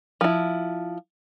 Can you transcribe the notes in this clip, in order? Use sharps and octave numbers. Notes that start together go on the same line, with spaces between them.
F3 E4